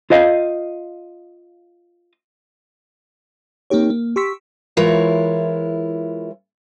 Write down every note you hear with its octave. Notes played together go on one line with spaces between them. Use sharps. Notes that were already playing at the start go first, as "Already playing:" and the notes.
F4 C5 D#5 F5
A#3 C4 D#4 G4 C#5
A#3
G4 C6 C#6 E6 B6
E3 G#3 E4 F4 A#4 C#5